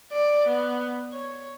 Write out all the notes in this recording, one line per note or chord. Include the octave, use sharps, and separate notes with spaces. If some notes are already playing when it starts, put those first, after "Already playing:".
D5
B3
C#5